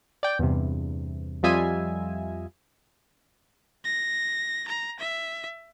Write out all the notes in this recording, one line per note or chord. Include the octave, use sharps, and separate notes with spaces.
D5 G5
E2 G2 C3
F2 G3 F4 D#5 E5 G#5
A#6
A#5
E5